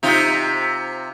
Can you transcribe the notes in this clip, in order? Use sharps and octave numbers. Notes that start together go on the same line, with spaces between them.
C3 D#4 F4